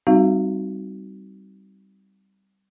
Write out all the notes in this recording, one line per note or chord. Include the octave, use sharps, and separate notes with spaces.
G3 C4 D#4 F#4 F5